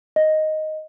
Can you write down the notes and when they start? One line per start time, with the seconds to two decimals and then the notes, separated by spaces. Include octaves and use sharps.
0.16 D#5